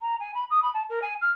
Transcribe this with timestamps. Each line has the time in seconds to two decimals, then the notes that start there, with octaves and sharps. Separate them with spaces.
0.01 A#5
0.20 G#5
0.35 B5
0.51 D#6
0.63 B5
0.74 A5
0.90 A#4
1.02 G#5
1.21 F6